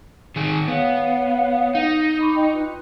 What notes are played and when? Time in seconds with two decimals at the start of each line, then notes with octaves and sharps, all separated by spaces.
0.36 D#3 G#4
0.68 B3 C#5 F5 F#5
1.75 D#4
2.20 B5 C#6 D6
2.36 D#5 G5
2.53 F4 B4